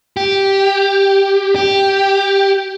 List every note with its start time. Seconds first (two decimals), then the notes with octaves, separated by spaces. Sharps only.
0.17 G4
1.56 G4